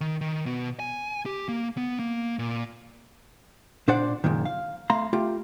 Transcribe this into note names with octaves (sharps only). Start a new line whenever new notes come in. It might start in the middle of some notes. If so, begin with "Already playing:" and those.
D#3
D#3
B2
G#5
G4
A#3
B3
A#3
A#2
A#2 D4 C5 D5 F#5
C#2 F#2 A#2 D#3
F5
A3 F5 A#5 C6
A3 F4 G4